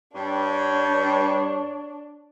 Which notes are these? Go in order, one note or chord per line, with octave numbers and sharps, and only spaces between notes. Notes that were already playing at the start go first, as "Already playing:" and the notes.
G2 D4 C#5